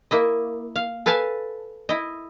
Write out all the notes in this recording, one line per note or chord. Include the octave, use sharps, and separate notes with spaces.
A#3 E4 D#5
F5
A4 B4 F5 G#5 A5
E4 D#5